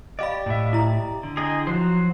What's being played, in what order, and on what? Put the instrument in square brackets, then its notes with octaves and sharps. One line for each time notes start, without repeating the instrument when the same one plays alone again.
[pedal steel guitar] G4 D5 [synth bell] D#5 F5 B5
[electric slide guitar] A2 E5
[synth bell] E4 A#5
[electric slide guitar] D3
[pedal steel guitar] G#4 D#5 G5
[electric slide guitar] F3 [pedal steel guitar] F#3 F#4 C5